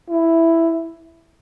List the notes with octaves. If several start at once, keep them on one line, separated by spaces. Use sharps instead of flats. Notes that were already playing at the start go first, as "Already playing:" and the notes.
E4